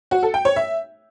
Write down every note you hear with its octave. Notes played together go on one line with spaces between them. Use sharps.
F#4
A4
G5
C#5
E5